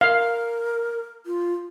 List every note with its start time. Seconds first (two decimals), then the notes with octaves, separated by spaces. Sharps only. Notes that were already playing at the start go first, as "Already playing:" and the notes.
0.01 A#4 F5
1.26 F4